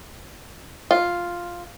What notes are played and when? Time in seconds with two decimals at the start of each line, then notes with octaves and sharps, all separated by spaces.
0.91 F4